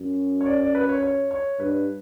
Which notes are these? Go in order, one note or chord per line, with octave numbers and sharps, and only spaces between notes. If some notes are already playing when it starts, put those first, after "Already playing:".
Already playing: F#2
C#5
D5
D5
B4
C#5
C#5
C#5
G2 B4